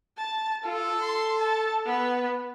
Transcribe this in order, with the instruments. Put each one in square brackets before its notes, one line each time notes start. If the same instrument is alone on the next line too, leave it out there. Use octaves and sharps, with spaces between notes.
[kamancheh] A5
[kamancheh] F4 [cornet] A4
[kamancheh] C6
A5
B3 B4